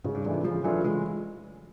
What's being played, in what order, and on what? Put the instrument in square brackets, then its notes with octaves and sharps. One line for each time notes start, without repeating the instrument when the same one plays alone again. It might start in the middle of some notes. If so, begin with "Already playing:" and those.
[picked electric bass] G#2 [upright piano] C#3
[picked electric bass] G2
[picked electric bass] G#2 [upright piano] E3 A3 D4 F4
[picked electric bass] C3
[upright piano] C#3 [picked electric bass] F3
[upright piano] E3 A3 D4 F4 [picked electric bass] F#3
[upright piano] C#3 [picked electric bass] G#3